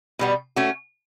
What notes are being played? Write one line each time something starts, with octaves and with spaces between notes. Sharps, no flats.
B2 G3 B3
A3 C#4 F#4